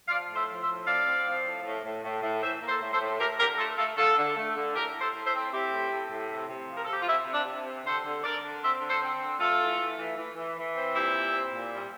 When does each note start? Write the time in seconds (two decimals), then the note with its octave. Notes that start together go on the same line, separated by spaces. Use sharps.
0.08 F3 D5 F5
0.28 A2
0.35 C5 E5
0.48 F3
0.61 C5 E5
0.66 A2
0.86 C4 D5 F5
1.05 C4
1.25 F3
1.44 A2
1.64 A2
1.83 A2
2.03 A2
2.22 A2
2.41 E3 C5 E5
2.61 A#3
2.67 A4 C5
2.81 A2
2.93 A4 C5
3.00 A2
3.19 A3 G4 A#4
3.38 D3 G4 A#4
3.57 A3 F4 A4
3.77 A3 F4 A4
3.96 D3 F4 A4
4.17 D3
4.36 A3
4.55 D3
4.74 A2 G4 A#4
4.94 A2
5.00 A4 C5
5.14 A2
5.25 C5 E5
5.32 C4
5.52 C4 E4 G4
5.71 A2
5.91 A2
6.11 A2
6.30 C3
6.49 C3
6.68 F3
6.76 A#4
6.84 A4
6.88 C3 G4
7.00 F4
7.07 C3 C4 E4
7.26 C3
7.32 D4
7.46 C3
7.66 C4
7.84 D3 A4 C5
8.04 D3
8.23 D3 A#4 D5
8.43 D3
8.62 C4 C5 E5
8.81 D3
8.88 A4 C5
9.01 C4
9.20 D3
9.39 A3 F4 A4
9.58 E3
9.79 A3
9.98 E3
10.17 E3
10.36 E3
10.57 E3
10.75 C4
10.94 A#2 E4 G4
11.15 A#2
11.34 C4
11.52 A#2
11.72 G3